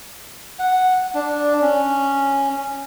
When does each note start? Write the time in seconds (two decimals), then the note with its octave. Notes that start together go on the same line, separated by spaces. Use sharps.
0.59 F#5
1.14 D4
1.61 C#4